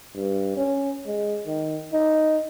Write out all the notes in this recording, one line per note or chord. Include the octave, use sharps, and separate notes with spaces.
G2
C#4
G#3
D#3
D#4